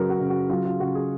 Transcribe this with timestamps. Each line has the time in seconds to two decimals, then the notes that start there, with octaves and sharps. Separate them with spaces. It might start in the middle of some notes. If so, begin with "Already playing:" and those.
Already playing: C#3 F#3 A#4 B4
0.09 F#4
0.20 C#3
0.30 F#4
0.50 F#3 F4
0.65 F4
0.80 C#3 F#4
0.95 G#4